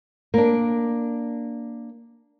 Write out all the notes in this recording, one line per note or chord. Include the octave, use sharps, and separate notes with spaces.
A#3 D4